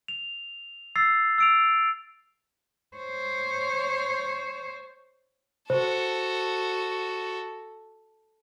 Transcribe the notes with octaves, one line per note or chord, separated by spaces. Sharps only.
F7
E6 A6 C7
E6 D7 F7
C5 C#5
F#4 A4 C5